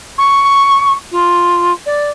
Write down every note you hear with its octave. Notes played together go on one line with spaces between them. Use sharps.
C#6
F4
D5